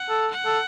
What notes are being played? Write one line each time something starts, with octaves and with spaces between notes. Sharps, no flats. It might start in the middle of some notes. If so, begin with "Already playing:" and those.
Already playing: F#5
A4
F#5
A4